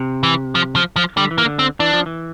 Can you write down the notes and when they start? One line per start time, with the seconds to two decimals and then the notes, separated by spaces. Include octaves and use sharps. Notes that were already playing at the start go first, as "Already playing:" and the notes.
Already playing: C3
0.23 E3
0.55 F3
0.76 F3
0.96 F3
1.17 D3 G3
1.31 E3
1.38 A#3
1.45 D3
1.59 C4
1.80 E3 D4
1.93 F3
2.06 E3